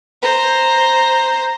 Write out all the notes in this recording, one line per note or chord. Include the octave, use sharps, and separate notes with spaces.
C5 A#5